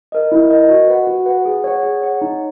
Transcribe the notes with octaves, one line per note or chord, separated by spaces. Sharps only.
A#4 D#5
E4
A#4 D#5
F#4
B4 F#5
F#4
B4 F#5
G#4
C#5 F#5
G#4
C#5 F#5
D#4